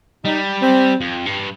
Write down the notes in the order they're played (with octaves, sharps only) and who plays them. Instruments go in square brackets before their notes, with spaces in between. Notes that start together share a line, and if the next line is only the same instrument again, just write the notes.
[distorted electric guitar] G3 [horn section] D#4
[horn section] C4
[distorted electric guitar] F2
G2